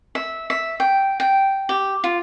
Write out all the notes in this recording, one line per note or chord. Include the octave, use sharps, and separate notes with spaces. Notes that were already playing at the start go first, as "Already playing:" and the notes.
E5
E5
G5
G5
G4
F4